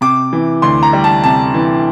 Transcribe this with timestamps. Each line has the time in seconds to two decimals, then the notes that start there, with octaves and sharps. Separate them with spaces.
0.01 C3 D6
0.33 E3
0.62 D2 C6
0.83 A#5
0.93 G3
1.04 A5
1.24 C3 A5
1.54 E3